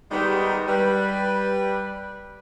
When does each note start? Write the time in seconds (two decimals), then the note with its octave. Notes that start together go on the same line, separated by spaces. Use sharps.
0.11 D#3 G3 G#3 B3 D#4 G4
0.68 G3 B4